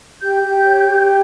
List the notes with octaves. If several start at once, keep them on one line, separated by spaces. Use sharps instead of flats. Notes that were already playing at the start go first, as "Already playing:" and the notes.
G4 G6
G4
C#5
G4